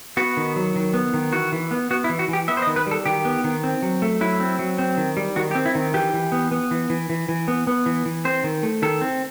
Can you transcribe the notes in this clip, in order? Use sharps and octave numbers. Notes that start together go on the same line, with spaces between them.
B3 F#4
D#3
F#3
D#3
B3
D#3
E3 F#4
E3
B3
B3 F#4
E4
E3
F#4
E3 G4
B3 E5
C5
D#5
D#3
B4
G3 A4
D#3 G4
B3
D#3
C4
F#3
A3
F#3 E4
C4
F#3
C4
D#3
G3
D#3 F#4
G4
C4
E4
D#3
E3 G4
E3
B3
B3
E3
E3
E3
E3
B3
B3
E3
E3
C4 C5
D#3
A3
D#3 A4
C4